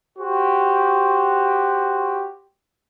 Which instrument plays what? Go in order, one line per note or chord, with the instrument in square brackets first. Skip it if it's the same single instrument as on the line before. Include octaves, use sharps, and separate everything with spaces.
[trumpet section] F#4 G4 C5